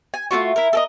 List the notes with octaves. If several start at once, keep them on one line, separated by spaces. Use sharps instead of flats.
G#5
A3 D4 F4 F#4
E4 A#4
A4 A#4 D#5